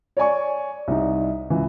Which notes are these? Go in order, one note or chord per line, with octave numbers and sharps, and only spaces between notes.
C#5 D5 G#5 C#6
C2 D#4
C#2 E3